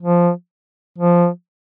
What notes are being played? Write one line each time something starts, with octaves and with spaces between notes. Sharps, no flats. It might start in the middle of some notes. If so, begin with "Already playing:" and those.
F3
F3